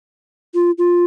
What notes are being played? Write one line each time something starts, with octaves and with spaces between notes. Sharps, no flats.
F4
F4